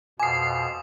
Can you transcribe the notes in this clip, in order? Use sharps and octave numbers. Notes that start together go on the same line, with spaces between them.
F2 B2 G#5 D6 D#6 C7